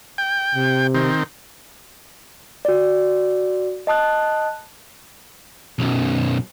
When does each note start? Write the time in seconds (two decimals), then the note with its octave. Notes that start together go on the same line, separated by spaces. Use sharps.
0.18 G5
0.55 C3
0.94 D#3 C4
2.65 F#4 D5
3.87 D#5 A5 D#6 F#6
5.79 B1 F#2